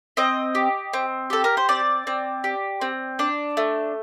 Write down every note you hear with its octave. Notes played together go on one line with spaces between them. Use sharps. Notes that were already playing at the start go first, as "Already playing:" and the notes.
C4 D#5
G4
C4
G4 A4
A#4
C5
C4 D5
C4
G4
C4
D4
A3